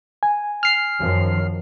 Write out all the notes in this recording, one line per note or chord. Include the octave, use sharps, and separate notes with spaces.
G#5
F6 C7
F#2 D#3 F3